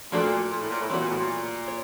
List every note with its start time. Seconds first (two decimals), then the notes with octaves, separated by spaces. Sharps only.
0.12 A#2 F3 A3 D4 F#4 A4
0.51 A#2
0.60 A2
0.70 A#2
0.80 A2
0.90 A#2 E3 G3 B3 D4 F#4
1.00 A#2
1.09 A2
1.19 A#2
1.68 C#5